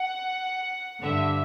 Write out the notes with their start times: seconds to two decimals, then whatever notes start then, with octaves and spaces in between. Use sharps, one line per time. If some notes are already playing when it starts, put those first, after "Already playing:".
Already playing: F#5
1.02 G2 D3 E5